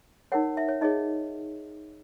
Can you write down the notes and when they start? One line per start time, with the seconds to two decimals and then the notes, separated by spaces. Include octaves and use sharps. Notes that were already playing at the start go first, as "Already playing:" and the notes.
0.32 D#4 A#4 C#5 F#5
0.57 E5
0.69 C#5
0.81 D#4 G#4 C#5 D#5